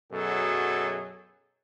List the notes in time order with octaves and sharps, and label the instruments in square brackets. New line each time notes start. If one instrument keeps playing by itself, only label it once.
[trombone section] F#2 B2 F#3 G#4 A4